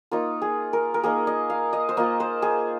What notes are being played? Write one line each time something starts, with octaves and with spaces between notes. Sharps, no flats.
A#3 D#4 F4
G#4
A#4
A#4
A#3 D#4 G#4
D#5
F5
D#5
C5
A#3 F4 D#5
C5
G#4